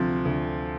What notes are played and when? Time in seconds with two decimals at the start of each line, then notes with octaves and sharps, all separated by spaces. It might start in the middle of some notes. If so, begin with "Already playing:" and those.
Already playing: D2 C3 F3
0.25 D2